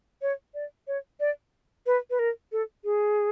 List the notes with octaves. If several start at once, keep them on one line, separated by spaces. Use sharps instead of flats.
C#5
D5
C#5
D5
B4
B4
A#4
A4
G#4